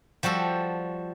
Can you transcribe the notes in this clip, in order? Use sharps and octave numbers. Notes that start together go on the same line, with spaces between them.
F3 G3 F#4 A4